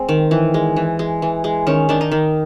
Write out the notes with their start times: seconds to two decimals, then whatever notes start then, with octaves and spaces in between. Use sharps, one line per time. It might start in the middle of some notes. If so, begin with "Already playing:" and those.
Already playing: G#3 C4
0.09 D#3
0.31 E3
0.54 G#3
0.77 E3
0.99 G#3
1.22 E3
1.44 G#3
1.67 D#3 C#4
1.89 D#3 D4
2.01 D#4
2.12 D#3